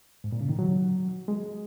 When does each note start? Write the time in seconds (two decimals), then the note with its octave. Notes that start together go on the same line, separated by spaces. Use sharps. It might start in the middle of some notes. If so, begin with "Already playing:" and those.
0.24 G#2
0.32 A#2
0.41 C#3
0.49 D#3
0.59 F#3
1.28 G#3